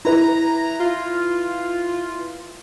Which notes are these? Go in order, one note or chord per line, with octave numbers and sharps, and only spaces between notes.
E4 B4 A#5
F4